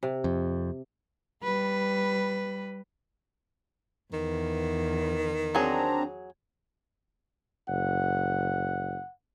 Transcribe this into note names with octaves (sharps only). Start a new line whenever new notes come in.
C3
F2
G3 B4
E2 D#3
F#3 C4 D4 G#4 A#5
F#1 F#5